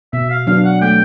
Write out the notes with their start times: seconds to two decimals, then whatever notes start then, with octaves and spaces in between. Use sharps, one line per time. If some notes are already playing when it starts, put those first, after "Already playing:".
0.13 B2 E5
0.30 F5
0.47 F#3 B3 D4 F5
0.65 F#5
0.82 A3 G5